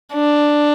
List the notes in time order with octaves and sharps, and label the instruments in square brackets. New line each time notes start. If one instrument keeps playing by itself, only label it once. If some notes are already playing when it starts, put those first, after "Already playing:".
[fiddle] D4